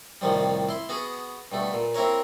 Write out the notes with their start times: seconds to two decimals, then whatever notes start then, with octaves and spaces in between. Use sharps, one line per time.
0.21 C2 A2 D#3 F3 G3
0.69 E4 C6
0.89 B3 F#4 G#4
1.52 G2 B2 A3
1.73 A#2
1.95 A#3 C4 E4 A#4 C#5